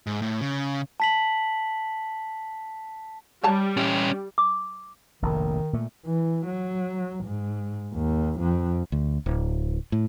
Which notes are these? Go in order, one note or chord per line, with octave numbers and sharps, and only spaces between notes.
G#2
A2
C#3
A5 B6 F#7
G3 C#5 A5 A#5
C#4 G4
D6
F1 A#1 A2 D#3
A#2 A3
E3
F#3
G#2
D#2
F2
D2
D1
A2